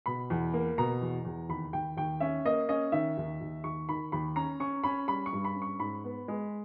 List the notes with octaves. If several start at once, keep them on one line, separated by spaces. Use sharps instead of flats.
B2 B5
E2
A#3
B2 A#5
E2
E2
D#2 B5
D#2 G5
D#2 G5
C#4 E5
A#3 D#5
C#4 D#5
D#3 E5
D#2
D#2
D#2 C#6
D#3 B5
D#2 B5
C#4 A#5
C#4 C#6
C#4 B5
G3 B5
C#6
G2
B5
C#4
C#6
G#2 B5
B3
G#3